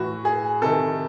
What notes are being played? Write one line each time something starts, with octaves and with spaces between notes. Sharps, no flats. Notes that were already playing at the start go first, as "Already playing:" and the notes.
Already playing: A2 E3 F#4
G#4
C3 D#3 A4